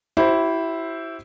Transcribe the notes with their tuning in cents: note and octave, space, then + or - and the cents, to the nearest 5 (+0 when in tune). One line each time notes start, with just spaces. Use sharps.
E4 +0 G4 -45 C5 +5